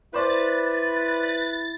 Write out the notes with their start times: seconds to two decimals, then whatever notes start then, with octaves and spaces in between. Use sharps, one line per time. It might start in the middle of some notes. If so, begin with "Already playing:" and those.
0.14 E4 B4 C5 D5 A6